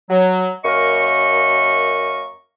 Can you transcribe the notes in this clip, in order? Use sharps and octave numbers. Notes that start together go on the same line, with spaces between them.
F#3
F#2 A#3 A#4 D#5 C#6